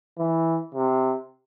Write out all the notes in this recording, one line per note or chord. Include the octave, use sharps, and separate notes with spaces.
E3
C3